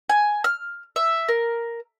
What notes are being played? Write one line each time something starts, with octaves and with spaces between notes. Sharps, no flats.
G#5
F6
E5
A#4